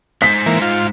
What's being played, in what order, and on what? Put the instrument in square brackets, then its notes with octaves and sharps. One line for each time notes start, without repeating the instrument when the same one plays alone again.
[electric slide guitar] G#3 D#4 C5 [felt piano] B6
[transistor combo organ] E3 A#3
F4